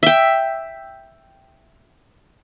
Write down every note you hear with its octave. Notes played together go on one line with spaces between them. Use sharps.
E5 G5